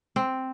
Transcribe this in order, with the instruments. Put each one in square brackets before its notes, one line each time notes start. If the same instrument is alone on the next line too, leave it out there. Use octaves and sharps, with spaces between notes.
[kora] C4